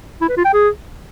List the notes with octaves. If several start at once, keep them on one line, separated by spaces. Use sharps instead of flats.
E4
B4
F4
G5
G#4